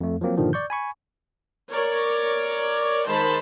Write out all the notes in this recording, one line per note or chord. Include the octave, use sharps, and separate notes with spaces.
F2 A3
F3 F#3 A#3 C4
G2 A#2 D3 D#3 F3 G3
D5 C#6 G6
G#5 B5 C#6
A#4 C#5 D5
D#3 G#3 C5 A5 B5